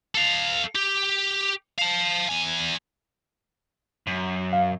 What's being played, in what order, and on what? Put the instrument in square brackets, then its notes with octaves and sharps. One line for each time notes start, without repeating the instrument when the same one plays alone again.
[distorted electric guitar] A4 F5
G4
F5 A5
E2 G#5
[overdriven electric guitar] F#2
[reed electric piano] F5